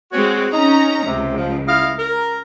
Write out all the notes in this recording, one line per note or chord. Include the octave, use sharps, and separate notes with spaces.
G#3 C4 F#4 C#5
C#4 D#4 A#5
C#2 C3
F3
E4 D#5 F5
A#4